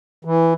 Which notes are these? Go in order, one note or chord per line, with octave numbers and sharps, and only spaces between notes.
E3